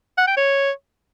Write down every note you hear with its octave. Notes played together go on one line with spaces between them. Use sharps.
F#5
G5
C#5